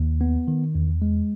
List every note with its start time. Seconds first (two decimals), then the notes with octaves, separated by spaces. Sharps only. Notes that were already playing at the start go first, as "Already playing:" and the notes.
Already playing: D#2
0.21 B3
0.48 D#3
0.75 E2
1.02 G#3